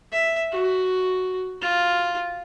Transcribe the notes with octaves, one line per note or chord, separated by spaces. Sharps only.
E5
F#4
F4